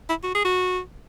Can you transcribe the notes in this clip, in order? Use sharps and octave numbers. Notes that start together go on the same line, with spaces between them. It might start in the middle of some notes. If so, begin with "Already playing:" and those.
E4
F#4
G#4
F#4